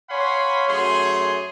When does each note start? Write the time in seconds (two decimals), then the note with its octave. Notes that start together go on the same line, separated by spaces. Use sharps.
0.10 C#5 F5 F#5 G#5 B5 C6
0.68 F#2 A3 G#4 C#5 C6